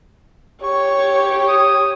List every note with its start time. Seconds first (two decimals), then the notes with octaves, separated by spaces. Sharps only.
0.64 G4 C#5 C#6
1.48 D#6